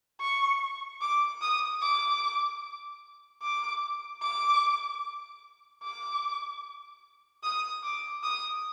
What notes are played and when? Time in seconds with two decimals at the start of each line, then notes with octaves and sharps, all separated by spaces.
0.21 C#6
1.02 D6
1.42 D#6
1.82 D6
3.42 D6
4.23 D6
5.83 D6
7.44 D#6
7.84 D6
8.24 D#6